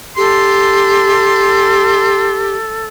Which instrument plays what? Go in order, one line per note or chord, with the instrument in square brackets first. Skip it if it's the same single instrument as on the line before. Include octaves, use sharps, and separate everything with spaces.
[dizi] G4 [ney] A4 [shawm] C6